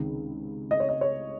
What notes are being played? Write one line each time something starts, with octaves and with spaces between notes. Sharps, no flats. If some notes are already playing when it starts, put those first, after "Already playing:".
Already playing: C#2 C3 D#3
D#5
C#5
D#5
C#5